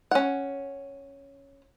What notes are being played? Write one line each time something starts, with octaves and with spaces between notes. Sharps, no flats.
C#4 F#5